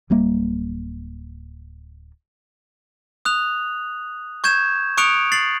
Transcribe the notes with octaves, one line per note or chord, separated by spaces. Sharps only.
D1 G3 A#3
D#6 F#6 F7
C#6 G6 G#6 E7
C#6 D#6 F#6 C#7 D7 F7
A6 C7 F#7